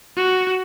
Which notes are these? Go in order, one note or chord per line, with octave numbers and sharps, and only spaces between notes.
F#4